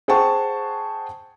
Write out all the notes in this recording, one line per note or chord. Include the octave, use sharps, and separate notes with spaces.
G#4 C5 F#5 G5 A5 C#6